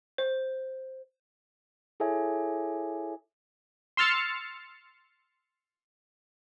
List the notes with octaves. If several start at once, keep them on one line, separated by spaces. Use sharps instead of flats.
C5
E4 G#4 A4 C#5 E5 G#5
C6 E6 F6 A6 C#7